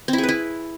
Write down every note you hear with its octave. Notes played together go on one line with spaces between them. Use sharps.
C4
E4
G#4
B4
E4